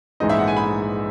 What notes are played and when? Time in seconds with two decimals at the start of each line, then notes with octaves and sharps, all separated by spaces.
0.20 A#1 G#2 E3 G#3 D#4 D#5
0.29 E5
0.39 F#5
0.47 G#5
0.57 B5